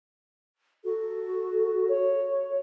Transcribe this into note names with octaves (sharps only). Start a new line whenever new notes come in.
F#4 A4
C#5